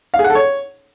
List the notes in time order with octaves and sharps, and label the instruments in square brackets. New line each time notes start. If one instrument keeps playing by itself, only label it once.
[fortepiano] F5
G#4
F#5
A4
C#5